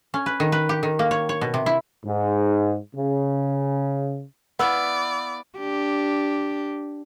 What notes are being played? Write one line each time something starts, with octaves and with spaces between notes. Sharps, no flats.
C#4
B4
D#3
B4
G4
D#3
A#3
C#5
C#5
B2
C3
E4
G#2
C#3
B3 E4 B4 D5 F5 F#5 E6
D4 G4